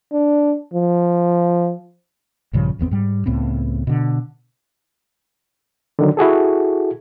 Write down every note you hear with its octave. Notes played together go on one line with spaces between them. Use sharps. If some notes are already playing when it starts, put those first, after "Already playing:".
D4
F3
A#1 G2 C#3 F3
G#1 E2 B3 C4
G#2 G3
C#2 A2 B3 C4
B2 D3
D3 D#3 F#3
E4 F#4 G#4 A4